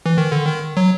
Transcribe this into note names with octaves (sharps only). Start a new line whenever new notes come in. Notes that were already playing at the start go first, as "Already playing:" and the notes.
E3
D#3
D3
D#3
F#3